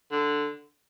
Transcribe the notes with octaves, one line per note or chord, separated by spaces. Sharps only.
D3